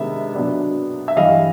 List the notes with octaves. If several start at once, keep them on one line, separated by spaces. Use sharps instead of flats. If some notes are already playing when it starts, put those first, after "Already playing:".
Already playing: C3 D#3 G#3 B3 D4 E5
B2 F#3 B3 D4
E5
G2 E3 G3 D#5 F5